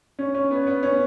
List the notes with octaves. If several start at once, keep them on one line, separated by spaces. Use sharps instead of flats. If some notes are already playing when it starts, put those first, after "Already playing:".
C#4
C#4
B3
B3
C#4